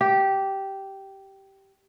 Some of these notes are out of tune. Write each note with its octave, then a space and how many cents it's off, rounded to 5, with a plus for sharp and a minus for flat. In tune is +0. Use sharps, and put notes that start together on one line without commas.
G4 -10